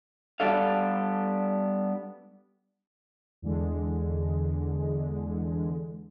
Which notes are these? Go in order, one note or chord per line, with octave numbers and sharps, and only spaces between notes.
G3 B3 D4 A4 F5
E2 D3 G#3